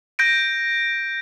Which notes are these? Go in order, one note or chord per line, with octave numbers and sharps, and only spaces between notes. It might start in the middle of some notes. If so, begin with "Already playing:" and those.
G6 A#6 D7